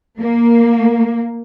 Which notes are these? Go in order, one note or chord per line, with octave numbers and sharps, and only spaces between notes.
A#3